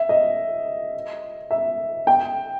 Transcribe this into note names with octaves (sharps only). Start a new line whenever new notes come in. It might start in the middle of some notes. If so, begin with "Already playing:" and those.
Already playing: E5
D#5
E5
G5